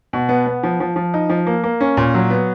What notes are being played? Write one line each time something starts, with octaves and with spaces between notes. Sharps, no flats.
B2
B3
B3
F3
F3
F3
D#4
F3
A#3
A#3
C#4
A#2
F#3
B3